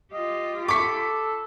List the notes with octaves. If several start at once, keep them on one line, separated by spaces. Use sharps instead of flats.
F4 G4 D#5
A4 B5 C#6 D6 B6